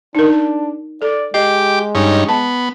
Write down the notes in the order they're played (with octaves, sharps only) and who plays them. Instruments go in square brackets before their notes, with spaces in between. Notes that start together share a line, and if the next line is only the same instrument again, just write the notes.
[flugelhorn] D4 [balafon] D#4 A#4
[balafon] A4 [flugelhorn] D5
[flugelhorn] G#3 [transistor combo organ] G4 D6 [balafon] D#5
[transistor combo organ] G2 C#4 D#4
[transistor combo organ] B3 [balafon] A5